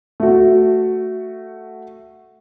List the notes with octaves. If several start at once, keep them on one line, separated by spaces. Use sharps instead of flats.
A3 F#4